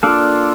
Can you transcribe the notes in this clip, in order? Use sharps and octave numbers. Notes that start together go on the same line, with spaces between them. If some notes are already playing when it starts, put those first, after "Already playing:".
A#3 D4 F4 G4 A4 D5 F5